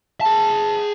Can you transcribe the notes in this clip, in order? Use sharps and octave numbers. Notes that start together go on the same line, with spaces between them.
G#4 A5